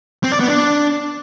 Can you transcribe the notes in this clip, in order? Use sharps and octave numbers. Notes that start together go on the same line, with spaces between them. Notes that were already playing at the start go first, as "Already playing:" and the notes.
C4
D5
B3
D4